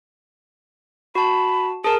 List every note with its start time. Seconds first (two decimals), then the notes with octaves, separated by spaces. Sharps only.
1.15 F#4 A5 B5
1.84 G#4 A#4 A5